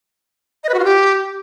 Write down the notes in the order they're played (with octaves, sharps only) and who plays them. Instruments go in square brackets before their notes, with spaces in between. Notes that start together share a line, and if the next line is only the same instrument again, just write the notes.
[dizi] D#5
B4
F#4
F4
G4